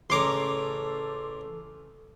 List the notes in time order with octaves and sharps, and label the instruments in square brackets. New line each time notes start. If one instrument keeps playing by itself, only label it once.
[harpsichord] A1 C#5 A#5 [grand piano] C#3 A3 [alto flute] A4 [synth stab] C6 D6